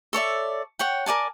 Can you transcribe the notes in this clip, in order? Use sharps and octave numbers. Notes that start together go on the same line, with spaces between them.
A4 C#5 D5 E5
C#5 F#5 G5
A#4 D5 G#5 A5